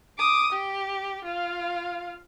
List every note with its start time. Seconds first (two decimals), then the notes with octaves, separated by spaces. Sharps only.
0.18 D6 D#6
0.53 G4
1.24 F4 F5